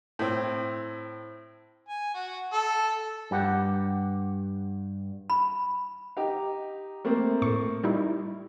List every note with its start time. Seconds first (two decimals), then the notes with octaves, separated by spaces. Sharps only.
0.19 A2 C4
1.88 G#5
2.14 F#4
2.53 A4
3.31 G2 G4 F#5
5.30 B5
6.17 D#4 G4
7.05 A3 A#3 C4
7.42 A2 C#6
7.83 G3 D#4 E4